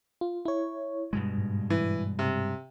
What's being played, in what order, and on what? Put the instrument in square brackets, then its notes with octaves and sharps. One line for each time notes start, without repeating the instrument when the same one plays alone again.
[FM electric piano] F4
E4 C#5
[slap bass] G2 B2 G#3
[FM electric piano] G#2
[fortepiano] E3
C3